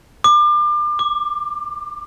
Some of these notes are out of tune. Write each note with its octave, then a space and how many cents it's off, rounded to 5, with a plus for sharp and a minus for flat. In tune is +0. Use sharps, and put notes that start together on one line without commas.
D6 +35
D6 +5